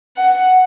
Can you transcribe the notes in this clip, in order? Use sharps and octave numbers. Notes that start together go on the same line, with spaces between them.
F#5